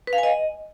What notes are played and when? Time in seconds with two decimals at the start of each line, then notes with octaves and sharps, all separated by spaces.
0.07 B4
0.13 F5
0.18 G#5
0.23 D#5